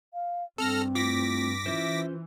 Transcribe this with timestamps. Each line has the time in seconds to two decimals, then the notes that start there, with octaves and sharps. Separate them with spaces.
0.14 F5
0.58 G2 C4 A4 F6 A#6
0.95 A3 E4 F4 D6 A#6 B6
1.66 E3 C#4 F4 C5 E5